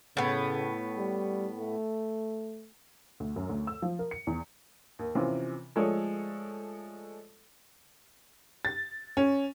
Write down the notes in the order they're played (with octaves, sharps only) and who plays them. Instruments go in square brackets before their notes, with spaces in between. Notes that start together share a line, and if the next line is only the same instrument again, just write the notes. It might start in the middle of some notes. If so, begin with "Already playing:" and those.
[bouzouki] A2 B3 [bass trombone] C#3
[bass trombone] G3
A3
[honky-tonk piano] D2
F#2
D2
E6
F3
A#4
C#7
E2
[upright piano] D#2
C3 E3 F3 C4 C#4 F4
F3 G#3 A3 A4 C#5 D5
[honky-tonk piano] A6
C#4